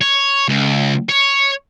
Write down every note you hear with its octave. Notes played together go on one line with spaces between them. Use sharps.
C#5
C#2
C#5